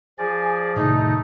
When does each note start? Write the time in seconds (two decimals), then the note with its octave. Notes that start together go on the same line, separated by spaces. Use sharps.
0.18 F3 G#4 D5 G#5
0.76 A2 C3 D#3 A3 D#4